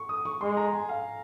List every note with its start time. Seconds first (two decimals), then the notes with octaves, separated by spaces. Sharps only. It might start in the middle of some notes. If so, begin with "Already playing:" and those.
Already playing: C#6
0.09 D#6
0.25 C#6
0.41 G#3 C6
0.57 A#5
0.73 G#5
0.89 F5